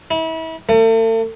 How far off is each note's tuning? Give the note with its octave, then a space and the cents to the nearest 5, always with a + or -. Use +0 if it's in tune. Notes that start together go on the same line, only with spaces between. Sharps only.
E4 -35
A3 +40